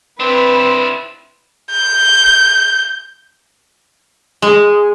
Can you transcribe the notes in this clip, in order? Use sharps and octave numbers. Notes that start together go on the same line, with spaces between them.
C4 D4 E4 B4
G6
G#3